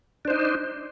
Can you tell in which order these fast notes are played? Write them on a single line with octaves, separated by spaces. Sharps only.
D4 C5 D#4